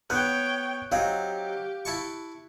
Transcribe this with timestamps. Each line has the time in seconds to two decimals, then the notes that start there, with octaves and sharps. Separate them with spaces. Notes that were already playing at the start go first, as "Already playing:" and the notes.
0.10 B3 C#5 G5 F#6
0.92 F#3 C4 D#4 G4 F5
1.85 E4 A5 C#6